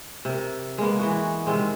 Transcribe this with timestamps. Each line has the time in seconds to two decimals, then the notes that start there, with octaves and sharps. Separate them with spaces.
0.25 C3 A#4
0.78 G#3 A#3 B3
0.99 E3 G#3 F#4
1.46 C3 D#3 G#3 C4